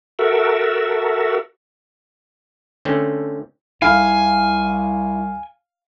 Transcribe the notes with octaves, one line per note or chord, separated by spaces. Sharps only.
F#4 A4 A#4 E5
D3 A3 C4 C#4
C2 E4 F5 G#5